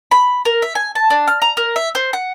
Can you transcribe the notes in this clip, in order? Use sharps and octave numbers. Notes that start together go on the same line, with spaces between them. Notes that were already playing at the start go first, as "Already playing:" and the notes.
B5
A#4
E5
G#5
A5
D4
F6
A#5
A#4
E5
C5
F#5